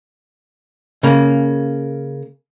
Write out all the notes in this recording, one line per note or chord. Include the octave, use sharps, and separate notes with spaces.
C#3 A#3